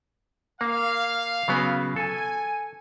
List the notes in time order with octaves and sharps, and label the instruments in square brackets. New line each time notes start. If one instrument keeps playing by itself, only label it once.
[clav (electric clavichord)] A#3 [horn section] F5
[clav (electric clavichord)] C#3 F#3 B3
[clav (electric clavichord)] A4 [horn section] G#5